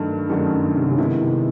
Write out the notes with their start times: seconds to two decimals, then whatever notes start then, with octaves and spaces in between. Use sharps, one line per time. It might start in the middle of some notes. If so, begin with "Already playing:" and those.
Already playing: G2 D#3 F#3 A3 D4
0.29 F#2 D#3 F#3 A3 D4
0.47 F#2
0.64 G2
0.74 C3
0.81 C#3
0.92 C#3
0.98 C3 D#3 G#3 B3 E4
1.21 C3